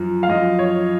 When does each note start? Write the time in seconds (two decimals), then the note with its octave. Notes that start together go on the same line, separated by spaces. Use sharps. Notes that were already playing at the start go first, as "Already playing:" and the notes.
Already playing: F#2 F3
0.23 F5
0.29 F#2 F3 D#5
0.59 C#5